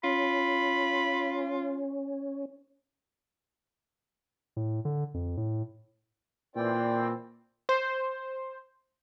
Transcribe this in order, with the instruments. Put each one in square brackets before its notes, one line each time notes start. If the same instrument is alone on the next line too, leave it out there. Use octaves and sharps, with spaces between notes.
[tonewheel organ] C#4 [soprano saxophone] F4 [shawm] B5
[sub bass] A2
D3
F2
A2
[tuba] A#2 [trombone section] E3 C4 [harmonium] D5 G5
[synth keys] C5